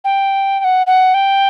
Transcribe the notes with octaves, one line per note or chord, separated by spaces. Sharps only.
G5
G5
F#5
F#5
G5